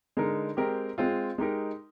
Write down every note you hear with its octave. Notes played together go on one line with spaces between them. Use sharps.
D3 G#3 D#4 A#4
G#3 C4 G4 A#4
G#3 C4 F4
G#3 D#4 G4 A#4